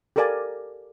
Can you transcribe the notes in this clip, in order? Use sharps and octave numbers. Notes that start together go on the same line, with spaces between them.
G4 A4 A#4 D5 F5 G#5